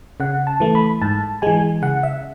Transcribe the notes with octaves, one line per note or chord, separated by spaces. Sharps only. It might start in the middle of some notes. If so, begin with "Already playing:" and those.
C#3 F#5
A5
E3 A3
B5
G#2 A5
E3 G#3 G#5
C#3 F#5
E5